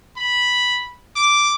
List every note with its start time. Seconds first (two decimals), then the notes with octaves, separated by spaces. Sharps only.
0.16 B5
1.16 D6